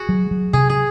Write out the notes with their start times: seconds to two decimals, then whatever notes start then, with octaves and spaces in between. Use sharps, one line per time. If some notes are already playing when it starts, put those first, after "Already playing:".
Already playing: F#4 G#4
0.09 F#3
0.31 F#3
0.53 C3 G#4
0.69 G#4